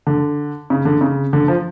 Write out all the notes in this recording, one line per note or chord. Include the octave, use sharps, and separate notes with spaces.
D3
C#3
D3
C#3
D3
F3